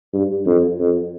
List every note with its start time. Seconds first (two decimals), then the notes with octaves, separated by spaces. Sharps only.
0.13 G2
0.46 F2
0.79 F2